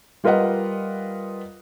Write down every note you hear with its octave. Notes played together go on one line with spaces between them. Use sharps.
G3 F4 A#4 B4 D#5 F#5